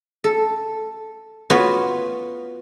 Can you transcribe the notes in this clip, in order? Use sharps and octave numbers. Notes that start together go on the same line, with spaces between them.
A4
B3 F4 F#4 C#5